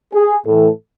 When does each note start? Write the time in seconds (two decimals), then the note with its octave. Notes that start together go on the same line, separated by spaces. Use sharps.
0.14 G#4
0.46 A2 E3 A4